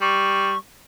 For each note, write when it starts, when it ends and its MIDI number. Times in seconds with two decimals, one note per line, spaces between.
0.01 0.54 55
0.01 0.57 85